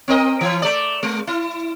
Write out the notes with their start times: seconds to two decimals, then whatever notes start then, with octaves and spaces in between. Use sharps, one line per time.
0.08 C4 A#4 D#5
0.41 E3
0.62 A3 D5
1.03 G#3
1.27 E4